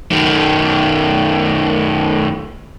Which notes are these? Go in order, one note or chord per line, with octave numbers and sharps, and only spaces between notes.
F#2 D#3